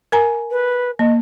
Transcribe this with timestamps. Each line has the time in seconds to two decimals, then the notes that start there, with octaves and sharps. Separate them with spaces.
0.12 A#4 G#5 A#5
0.51 B4
0.99 A#3 D#5